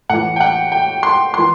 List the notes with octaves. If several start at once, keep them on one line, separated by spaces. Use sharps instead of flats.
A2 E3 F#5
G5
F#5
G5
C6
E3 C6